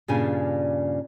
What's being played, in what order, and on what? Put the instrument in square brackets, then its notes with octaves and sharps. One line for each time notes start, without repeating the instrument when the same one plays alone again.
[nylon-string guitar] G2 A#2 C#3 G3 D4 G#5